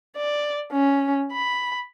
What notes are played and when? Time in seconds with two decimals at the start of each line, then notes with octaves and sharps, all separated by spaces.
0.17 D5
0.72 C#4
1.32 B5